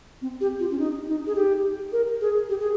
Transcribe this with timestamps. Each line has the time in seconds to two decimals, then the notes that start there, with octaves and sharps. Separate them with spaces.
0.22 C4
0.41 G4
0.60 F4
0.71 C#4
0.79 D#4
1.07 D#4
1.27 G#4
1.35 G4
1.92 A#4
2.21 G#4
2.49 G4
2.61 G#4